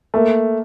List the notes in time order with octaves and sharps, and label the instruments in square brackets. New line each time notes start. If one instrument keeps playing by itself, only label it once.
[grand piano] A3 [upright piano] A#3